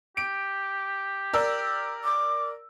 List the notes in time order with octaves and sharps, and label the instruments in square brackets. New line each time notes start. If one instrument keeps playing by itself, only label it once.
[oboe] G4 [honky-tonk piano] D7
[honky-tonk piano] A#4 D5 E6
[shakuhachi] D6